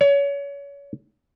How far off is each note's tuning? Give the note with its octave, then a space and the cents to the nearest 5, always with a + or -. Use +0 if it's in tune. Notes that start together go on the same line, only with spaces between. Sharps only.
C#5 +30